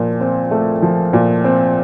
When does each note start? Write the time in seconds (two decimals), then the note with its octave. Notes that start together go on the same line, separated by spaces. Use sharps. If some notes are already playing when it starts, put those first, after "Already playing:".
Already playing: A#2 F3
0.20 C4
0.51 A3
0.82 F3
1.13 A#2
1.44 C4